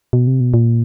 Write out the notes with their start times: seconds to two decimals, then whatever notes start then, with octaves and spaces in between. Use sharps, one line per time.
0.13 B2
0.27 C3
0.40 B2
0.54 A#2